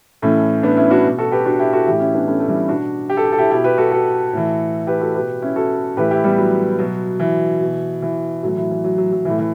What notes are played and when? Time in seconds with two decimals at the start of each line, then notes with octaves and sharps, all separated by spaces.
0.22 A2 E3 A3 C#4
0.63 B3 D4
0.77 C#4 E4
0.91 D4 F#4
1.04 B2
1.18 F#4 A4
1.32 G4 B4
1.45 D4 F#4
1.59 E4 G4
1.73 F#4 A4
1.87 A2 E3 E4 G4
2.00 C#4 E4
2.14 B3 D4
2.27 A3 C#4
2.39 A3
2.48 E3 G3
2.68 B2 D4 F#4
3.10 G4
3.17 A4
3.24 G4
3.32 A4
3.38 E4 G4
3.51 B2 E4 G4
3.64 G4 B4
3.78 F#4 A4
3.92 F#4 A4
4.33 A2 E3
4.87 G4 B4
5.01 F#4 A4
5.15 B2 G4 B4
5.42 C#4 E4
5.56 F#4 A4
5.97 A2 E3 G4 B4
6.11 E4 G4
6.24 G3 B3
6.38 F#3
6.79 B2 F#3
7.19 E3
7.61 B2
8.02 E3
8.43 A2 E3 F#3
8.57 E3
8.71 E3
8.84 F#3
8.98 F#3
9.12 F#3
9.25 A2 E3
9.39 E3